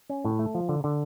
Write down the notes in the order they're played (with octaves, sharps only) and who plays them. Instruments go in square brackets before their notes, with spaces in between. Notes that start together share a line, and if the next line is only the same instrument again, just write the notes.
[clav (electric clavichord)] C#4
A2
A3
F3
D3
D3